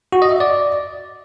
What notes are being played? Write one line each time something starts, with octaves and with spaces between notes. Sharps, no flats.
F#4
D#5
E5
D5